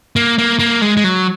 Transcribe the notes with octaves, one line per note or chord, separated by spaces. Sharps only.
A#3
A#3
A#3
G#3
G#3
F#3